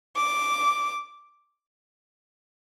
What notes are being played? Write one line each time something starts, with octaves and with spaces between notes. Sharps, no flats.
D6